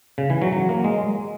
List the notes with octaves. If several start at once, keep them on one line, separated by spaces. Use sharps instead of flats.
C#3
E3
F#3
F#3
A#3
G#3